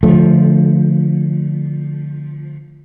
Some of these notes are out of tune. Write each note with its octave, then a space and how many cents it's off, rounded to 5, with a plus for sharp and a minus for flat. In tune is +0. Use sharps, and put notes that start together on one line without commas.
D3 +0 F3 +0 A3 -20